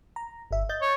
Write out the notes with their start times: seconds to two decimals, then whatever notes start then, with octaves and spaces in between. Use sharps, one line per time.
0.16 A#5
0.51 G1 E5
0.69 D#5 G6 A6
0.81 C#5